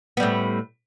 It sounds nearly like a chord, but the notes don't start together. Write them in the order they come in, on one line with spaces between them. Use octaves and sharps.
B3 G3 A2